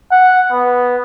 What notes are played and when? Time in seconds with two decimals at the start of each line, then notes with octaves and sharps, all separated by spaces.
0.11 F#5
0.52 B3